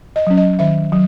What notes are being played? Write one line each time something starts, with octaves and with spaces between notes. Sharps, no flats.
D#5
F#3 C#4
D#5
D#3 E5
F#3